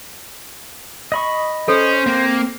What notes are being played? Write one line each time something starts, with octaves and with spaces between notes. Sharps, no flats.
D#5 B5 C#6
C#4 A4 C5
A#3 C4